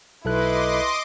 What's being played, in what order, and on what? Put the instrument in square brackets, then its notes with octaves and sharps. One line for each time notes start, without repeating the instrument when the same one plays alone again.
[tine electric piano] B1 A4 F#6 [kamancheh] E4 B4 [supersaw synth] D#5 C6 D6